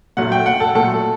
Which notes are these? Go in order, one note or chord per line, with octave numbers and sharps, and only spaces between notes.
A#2 F#3 A3 F#5
G5
F#5
A4
A#2 F#3 A3 A4